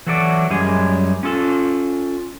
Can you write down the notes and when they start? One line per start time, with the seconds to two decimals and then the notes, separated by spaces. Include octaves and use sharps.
0.07 E3 F#3 F#4 A4 D5
0.50 F#2 G3 G#3 G#4 G#5
1.23 C#4 F4 A4